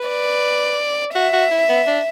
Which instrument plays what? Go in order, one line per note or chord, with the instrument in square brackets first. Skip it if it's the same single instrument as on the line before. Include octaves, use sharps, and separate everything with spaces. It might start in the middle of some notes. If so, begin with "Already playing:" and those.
Already playing: [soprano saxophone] B4
[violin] D5
[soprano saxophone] F#4 [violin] E5
[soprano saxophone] F#4
E4
B3
D4